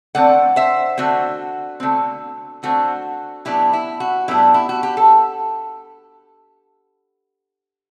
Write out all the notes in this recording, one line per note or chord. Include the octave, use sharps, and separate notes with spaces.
D3 A3 C4 D5 F#5
C5 E5
D3 A3 C4 F#4
D3 A3 C4
D3 A3 C4 F#4
A2 F#3 B3 D4 E4 G4
E4
F#4
A2 F#3 B3 D4 E4 G4
E4
F#4
G4
A4